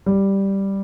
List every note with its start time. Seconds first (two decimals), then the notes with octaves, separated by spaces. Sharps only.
0.06 G3